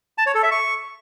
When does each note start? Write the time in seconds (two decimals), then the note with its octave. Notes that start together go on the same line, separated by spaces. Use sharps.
0.18 A5
0.26 C#5
0.35 A4
0.43 E5
0.51 C#6